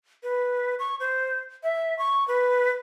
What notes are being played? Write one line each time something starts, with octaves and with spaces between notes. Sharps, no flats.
B4
C#6
C5
E5
C#6
B4